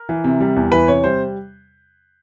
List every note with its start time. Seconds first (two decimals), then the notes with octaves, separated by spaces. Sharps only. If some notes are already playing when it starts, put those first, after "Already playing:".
Already playing: A#4
0.09 E3
0.24 C3
0.40 G3
0.56 E2
0.72 E3 B4
0.88 C3 C#5
1.04 G3 C5